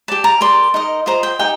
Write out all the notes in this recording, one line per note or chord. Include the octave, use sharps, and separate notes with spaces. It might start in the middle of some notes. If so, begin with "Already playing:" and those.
G4 D5 A5
A#5
G4 A#4 D5 C6
D#4 A#4 D#5
F4 C5 D#5 A#5
G5
D#4 G4 G5